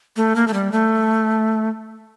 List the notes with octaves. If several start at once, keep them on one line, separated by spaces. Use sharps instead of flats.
A3
A#3
A3
G3
A3